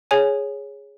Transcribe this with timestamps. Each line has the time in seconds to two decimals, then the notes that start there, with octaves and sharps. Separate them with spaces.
0.11 G#4 C#5 G#5